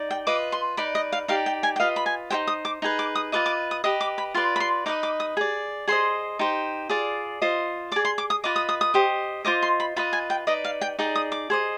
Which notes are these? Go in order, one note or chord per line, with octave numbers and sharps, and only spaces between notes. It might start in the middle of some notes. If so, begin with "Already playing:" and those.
Already playing: D#4 D5
G5
F4 B4 D#5 D6
C6
D#4 B4 D5 B5
D#5
F5
D#4 G4 D5 F5
G5
G#5
G5
F4 B4 D#5 F5
B5
G#5
D#4 G4 C5 G5
D#6
D6
D#4 G#4 B4
D6
D#6
F4 B4 D#5 D6
D6
D#6
G4 B4 D#5 D#6
D6
B5
F4 B4 D5 C6
B5
C6
D#4 B4 D#5 D6
D6
D#6
G#4 D5
G#4 C5 D#5 C6
D#4 G4 C5
F4 G#4 D5
F4 C5 D#5
G#4 D5 D6
C6
D6
D#6
F4 B4 D#5 D6
D#6
D#6
D#6
G4 C5 D#5
F4 C5 D#5 D6
C6
B5
F4 B4 D#5 B5
G#5
G5
D#4 B4 D5 D#5
F5
G5
D#4 G#4 D5 G5
D#6
D6
G#4 C5 D#5